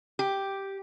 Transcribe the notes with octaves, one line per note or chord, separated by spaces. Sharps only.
G4